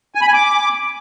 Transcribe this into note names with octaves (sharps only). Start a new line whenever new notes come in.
G#5
B5
G#5
D6